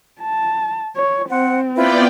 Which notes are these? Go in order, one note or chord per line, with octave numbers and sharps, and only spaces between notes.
A5
C#5
C4 C5 F#5
B3 E4 F4 B4 D5 G5